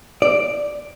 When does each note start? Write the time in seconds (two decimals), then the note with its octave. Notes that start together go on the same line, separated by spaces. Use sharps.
0.22 D5